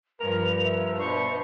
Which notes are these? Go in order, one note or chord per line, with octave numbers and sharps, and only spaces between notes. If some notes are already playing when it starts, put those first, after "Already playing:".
G2 F3 A#4 B4 F7
E5
B2 D4 C5 C#6